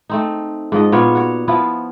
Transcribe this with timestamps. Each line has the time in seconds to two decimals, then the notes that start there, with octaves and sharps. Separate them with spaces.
0.09 A3 C4 D#4
0.72 G#2 F3 D#5
0.92 A#2 B3 C#5 F5
1.15 F#4 C#5
1.48 F3 B3 E4 F5